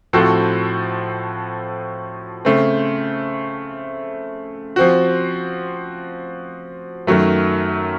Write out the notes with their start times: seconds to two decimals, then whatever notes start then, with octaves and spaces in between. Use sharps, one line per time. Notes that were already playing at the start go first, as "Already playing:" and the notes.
0.13 A2 F3 C4 F#4 A4
2.45 C#3 A3 C4
4.76 F3 C4 F#4
7.07 F#2 D#3 F#3 A3